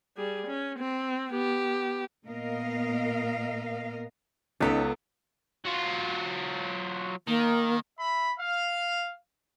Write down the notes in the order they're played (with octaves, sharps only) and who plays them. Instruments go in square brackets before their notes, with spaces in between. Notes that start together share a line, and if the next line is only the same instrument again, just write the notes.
[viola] G3 G#4
C#4
C4
B3 G4
[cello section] A#2 B3 A#4 D#5 F5
[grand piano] C#2 [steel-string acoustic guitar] B3 A4 A#5 [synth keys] C#4 D#4 B6
[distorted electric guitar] F#3 F4
[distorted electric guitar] D#3 [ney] A#3
[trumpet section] E5 B5
F5